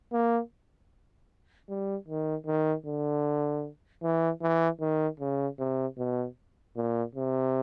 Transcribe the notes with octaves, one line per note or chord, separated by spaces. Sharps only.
A#3
G3
D#3
D#3
D3
E3
E3
D#3
C#3
C3
B2
A#2
C3